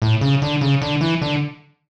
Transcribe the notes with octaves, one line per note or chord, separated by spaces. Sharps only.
A2
C#3
D3
C#3
D3
E3
D3